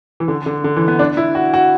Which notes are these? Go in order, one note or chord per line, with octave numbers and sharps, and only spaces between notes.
E3
D3
D3
D3
E3
B3
D4
E4
F#4
F#4